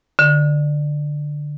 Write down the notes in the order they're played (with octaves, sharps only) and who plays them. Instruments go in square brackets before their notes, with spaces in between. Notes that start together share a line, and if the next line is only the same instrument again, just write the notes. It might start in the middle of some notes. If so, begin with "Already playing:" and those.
[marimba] D3